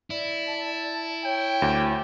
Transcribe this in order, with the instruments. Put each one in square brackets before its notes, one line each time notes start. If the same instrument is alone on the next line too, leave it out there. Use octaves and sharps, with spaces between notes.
[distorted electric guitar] E4 [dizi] D5
[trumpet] A5
[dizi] C#5 [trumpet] G5
[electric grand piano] D2